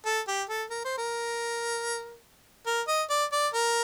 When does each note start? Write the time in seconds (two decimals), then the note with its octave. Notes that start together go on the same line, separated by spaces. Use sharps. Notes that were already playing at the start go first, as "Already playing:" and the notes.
0.05 A4
0.28 G4
0.49 A4
0.70 A#4
0.85 C5
0.98 A#4
2.66 A#4
2.87 D#5
3.10 D5
3.32 D5
3.54 A#4